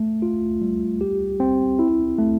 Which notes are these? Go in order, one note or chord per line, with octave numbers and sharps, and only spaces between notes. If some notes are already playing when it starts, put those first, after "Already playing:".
Already playing: A3
F4
G3
G4
C4
E4
A3